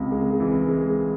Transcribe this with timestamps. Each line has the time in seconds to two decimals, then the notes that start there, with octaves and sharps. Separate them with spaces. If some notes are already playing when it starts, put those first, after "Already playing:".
Already playing: C#2 C3
0.12 G#3
0.40 E3
0.69 G#3